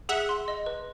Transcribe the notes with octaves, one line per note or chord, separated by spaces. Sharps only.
G#4 E5 F#5
C6
D#5
B4